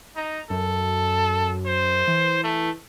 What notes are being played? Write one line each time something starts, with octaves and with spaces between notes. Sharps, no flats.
D#4 A#5
F#2 A4
C5
E3
A3